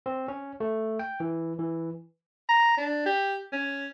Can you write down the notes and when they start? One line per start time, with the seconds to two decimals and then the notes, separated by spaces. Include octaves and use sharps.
0.06 C4
0.28 C#4
0.60 A3
0.99 G5
1.20 E3
1.59 E3
2.49 A#5
2.77 D4
3.06 G4
3.52 C#4